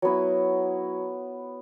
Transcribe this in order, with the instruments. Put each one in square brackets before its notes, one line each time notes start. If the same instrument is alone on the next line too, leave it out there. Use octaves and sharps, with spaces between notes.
[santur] F#3 B3 E4